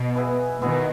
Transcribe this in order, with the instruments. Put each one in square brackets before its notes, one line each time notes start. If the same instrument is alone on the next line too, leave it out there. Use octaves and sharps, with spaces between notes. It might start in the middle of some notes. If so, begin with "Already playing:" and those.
Already playing: [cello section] B2
[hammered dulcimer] E3 B3 E4 G#4
[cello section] B2 D#3 [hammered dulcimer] E3 B3 E4 G#4